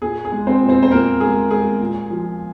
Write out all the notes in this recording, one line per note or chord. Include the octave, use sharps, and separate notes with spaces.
A#2 G#4
G#4
G#3
C4 C5
A#2
C4 C5
C5
A#2 A#3 A#4
G#3 G#4
G#3 G#4
A#2
F3